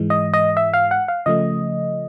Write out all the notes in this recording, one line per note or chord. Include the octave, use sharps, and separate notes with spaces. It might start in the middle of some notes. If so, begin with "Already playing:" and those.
Already playing: G#2 E3 G#3
D#5
D#5
E5
F5
F#5
F5
C#3 F3 A3 D#5